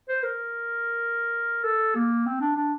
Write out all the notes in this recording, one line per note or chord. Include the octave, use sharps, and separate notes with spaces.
C5
A#4
A4
A#3
C4
D4
D4